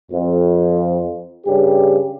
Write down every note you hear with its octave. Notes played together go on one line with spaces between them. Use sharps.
F2
G2 C#3 G4